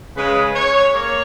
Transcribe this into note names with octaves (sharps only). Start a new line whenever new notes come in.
C#3 G#3 B4
C#5
A#3 C#5